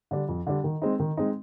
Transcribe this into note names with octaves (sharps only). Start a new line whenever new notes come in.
D3 G3 D4
F2
D3 G3 D4
D#3
G#3 C4 D#4
D#3
G#3 C4 D#4